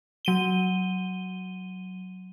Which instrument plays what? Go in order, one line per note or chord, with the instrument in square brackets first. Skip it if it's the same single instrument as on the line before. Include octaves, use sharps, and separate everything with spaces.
[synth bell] F#3 D#7 G7